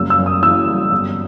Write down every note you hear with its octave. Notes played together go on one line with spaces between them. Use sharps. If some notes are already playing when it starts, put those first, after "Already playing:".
Already playing: F#1 G3 E6
E6
F#2
D#6
E3 E6
G3
G1